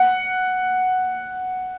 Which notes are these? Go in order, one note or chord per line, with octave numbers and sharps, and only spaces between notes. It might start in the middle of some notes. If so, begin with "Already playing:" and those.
Already playing: F#5